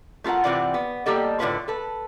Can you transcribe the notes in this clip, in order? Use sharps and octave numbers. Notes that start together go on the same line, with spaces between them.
A3 F4 G4 A#4 F#5
C3 E3 C4 F4 D5 F#5
B3
G3 A#3 G4 A4 D#5
A2 D3 G#3 F4 B4 C#5
A4 B4